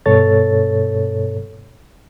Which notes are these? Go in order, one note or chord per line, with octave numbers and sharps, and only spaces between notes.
G2 B2 A4 C#5 A6